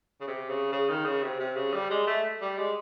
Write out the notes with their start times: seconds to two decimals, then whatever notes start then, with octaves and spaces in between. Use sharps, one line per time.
0.21 C#3
0.27 C3
0.49 C#3
0.72 C#3
0.89 D#3
1.05 C#3
1.23 C3
1.40 C3
1.56 C#3
1.73 G3
1.90 G#3
2.07 A3
2.41 G3
2.58 G#3